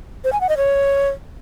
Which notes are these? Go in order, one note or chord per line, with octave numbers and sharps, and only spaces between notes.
C5
G#5
F#5
D#5
C#5